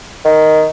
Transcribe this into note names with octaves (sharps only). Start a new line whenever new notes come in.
D#3